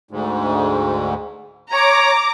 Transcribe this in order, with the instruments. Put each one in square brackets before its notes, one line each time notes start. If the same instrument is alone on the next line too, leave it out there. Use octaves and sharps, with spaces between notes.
[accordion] D2 G#2
[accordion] C#5 [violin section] A#5 D6